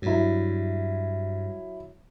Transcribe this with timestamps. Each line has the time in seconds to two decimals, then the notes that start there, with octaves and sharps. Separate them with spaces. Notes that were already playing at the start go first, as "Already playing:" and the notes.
0.02 G2 F#3 E4